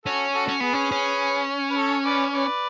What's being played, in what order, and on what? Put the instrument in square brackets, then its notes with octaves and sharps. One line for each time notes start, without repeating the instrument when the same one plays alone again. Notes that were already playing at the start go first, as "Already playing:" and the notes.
[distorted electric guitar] C#4 [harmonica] F#4 A4
[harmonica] F#4 A4
[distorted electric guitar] C#4
[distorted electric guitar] B3 [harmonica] G#4 B4
[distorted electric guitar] C#4
C#4
[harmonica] B4
A4 C#5
B4 D5
B4 D5